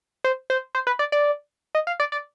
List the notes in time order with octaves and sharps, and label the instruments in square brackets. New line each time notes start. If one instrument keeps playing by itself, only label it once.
[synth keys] C5
C5
C5
B4
D5
D5
D#5
F5
D5
D5